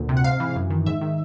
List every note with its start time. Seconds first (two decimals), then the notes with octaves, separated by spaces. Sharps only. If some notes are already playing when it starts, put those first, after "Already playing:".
Already playing: D2 A#2
0.09 C3
0.17 F#5
0.24 G#2 F5
0.40 E3
0.56 F#2
0.70 D#3
0.86 G#2 E5
1.01 D#3